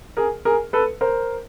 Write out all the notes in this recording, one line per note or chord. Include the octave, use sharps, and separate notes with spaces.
G#4 A#4
G#4 A#4
A4 B4
A#4 C5